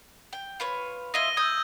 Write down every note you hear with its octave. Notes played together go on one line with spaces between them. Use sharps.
G5
F4 B4 C#5
E4 F4 D#5 A#6 D#7 G7
D#6 E6 G6 G#6